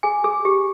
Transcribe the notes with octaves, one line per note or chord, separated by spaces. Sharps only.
G#4 G#5
G#4
G4